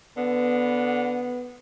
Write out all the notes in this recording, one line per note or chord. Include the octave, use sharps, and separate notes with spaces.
D3 B3